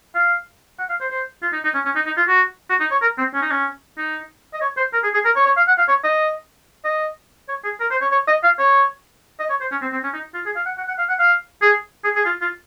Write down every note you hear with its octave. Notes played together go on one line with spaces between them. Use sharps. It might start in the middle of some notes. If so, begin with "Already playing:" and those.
F5
F#5
F5
C5
C5
F4
D#4
D#4
C#4
C#4
D#4
D#4
F4
F#4
F#4
D#4
C#5
A#4
C4
C#4
D#4
C#4
D#4
D#5
C#5
C5
A#4
G#4
G#4
A#4
C#5
C#5
F5
F#5
F5
C#5
D#5
D#5
C#5
G#4
A#4
C5
C#5
C#5
D#5
F5
C#5
D#5
C#5
C5
C#4
C4
C4
C#4
D#4
F4
G#4
F5
F#5
F#5
F#5
F5
F#5
F5
G#4
G#4
G#4
F4
F4